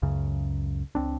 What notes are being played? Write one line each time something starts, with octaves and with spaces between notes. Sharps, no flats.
C#2 F#2 C#3
C#2 C4 D4